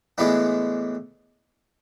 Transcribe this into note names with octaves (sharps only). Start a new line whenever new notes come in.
A2 E3 G#3 B3 D4